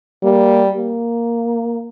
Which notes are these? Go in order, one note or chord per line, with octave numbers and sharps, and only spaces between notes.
G3 A#3
A#3